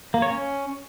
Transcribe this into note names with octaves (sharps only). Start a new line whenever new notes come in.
A#3
C#5
C#4